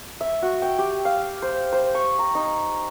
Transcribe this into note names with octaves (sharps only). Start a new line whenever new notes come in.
E5
F#4
G5
G4
F5
C5
C5
C#6
A#5
D#4